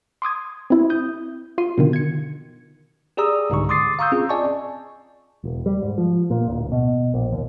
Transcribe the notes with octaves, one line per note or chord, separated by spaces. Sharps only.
C6 D6 D#6 G#6
C4 E4
D#6 G6
F4 C6 D#7
B2 D3 D#3
G#6 C#7
G4 G#4 D5 A#5 D#6 E6
C2 G#2 D3 C#6
C6 D6 D#6 A6 C7
F5 A#5 C#6 D#6 E6 G6
C4 C#4 F4 G#4
D5 D#5 G#5 A5 C#6
E1
G3
G#2
F3
A#2
D1
B2
A#1
D#2